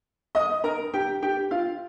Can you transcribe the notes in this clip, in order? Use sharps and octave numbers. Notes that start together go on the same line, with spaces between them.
D#5 D#6
A#4 A#5
G4 G5
G4 G5
F4 F5